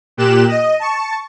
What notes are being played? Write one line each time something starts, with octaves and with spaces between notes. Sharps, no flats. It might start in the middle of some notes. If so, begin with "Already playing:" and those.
A#2 G4 F#6 E7
D#5
A5 C#6